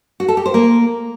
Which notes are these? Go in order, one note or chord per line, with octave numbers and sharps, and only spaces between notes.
F#4
A4
G4
C5
A#3